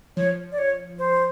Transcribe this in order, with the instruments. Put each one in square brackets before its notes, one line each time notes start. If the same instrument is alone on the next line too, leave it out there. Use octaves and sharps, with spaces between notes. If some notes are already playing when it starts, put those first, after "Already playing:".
[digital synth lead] F3 [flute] C#5
[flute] D5
C#5
C5